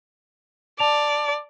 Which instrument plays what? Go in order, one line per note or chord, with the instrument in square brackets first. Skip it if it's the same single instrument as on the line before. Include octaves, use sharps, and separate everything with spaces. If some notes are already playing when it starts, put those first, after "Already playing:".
[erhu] D5 [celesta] A5 F7